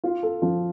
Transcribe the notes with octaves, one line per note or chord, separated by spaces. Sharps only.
F4
A4
F3